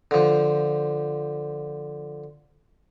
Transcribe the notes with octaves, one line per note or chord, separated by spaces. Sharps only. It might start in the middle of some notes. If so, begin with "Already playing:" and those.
D3 F3